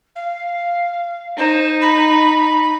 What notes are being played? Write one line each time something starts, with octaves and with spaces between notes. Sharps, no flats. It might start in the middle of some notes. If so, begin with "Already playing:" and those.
F5
D#4 C5
B5